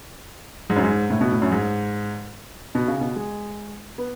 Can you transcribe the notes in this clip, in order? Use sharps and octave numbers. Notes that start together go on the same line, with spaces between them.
G#2
F#2
G#2
A2
B2
A2
F#2
G#2
B2
C#3
B2
G#3
B3